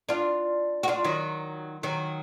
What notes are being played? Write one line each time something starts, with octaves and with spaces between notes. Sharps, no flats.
D4 F4
F#4
D4 F4
D#3 F#3
D#3 F#3